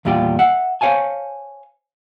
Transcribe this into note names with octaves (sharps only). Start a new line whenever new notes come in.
E2 A#2 G3 F4 G4
E5 F#5
C5 C#5 F5 G#5 A5